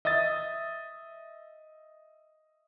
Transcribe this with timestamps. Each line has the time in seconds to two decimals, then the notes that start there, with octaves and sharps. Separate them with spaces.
0.05 D#5 E5 D#6 A6